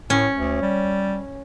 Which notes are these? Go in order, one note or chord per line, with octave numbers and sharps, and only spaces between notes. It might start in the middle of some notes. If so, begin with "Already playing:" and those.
A2 C#4
D2
G3